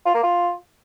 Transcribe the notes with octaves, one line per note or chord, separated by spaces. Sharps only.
F4
A#3
F4